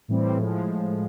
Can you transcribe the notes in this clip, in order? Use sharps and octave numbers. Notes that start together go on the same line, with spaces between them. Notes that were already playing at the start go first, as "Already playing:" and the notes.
A2 E3 G3 C4
A2 F3 G#3